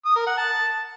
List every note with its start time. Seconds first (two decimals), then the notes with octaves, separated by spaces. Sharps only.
0.05 D#6
0.16 A#4
0.27 F#5
0.38 A5